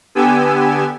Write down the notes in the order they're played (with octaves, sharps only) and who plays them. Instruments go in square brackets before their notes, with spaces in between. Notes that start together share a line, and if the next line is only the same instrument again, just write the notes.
[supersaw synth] D3 B3 G4 G#5 E6